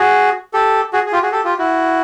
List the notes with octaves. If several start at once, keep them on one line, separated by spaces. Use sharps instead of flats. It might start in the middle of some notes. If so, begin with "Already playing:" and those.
Already playing: F#4 G#4
G4 A4
F#4 G#4
G#4
F4 G4
F#4 G#4
G4 A4
F4 G4
E4 F#4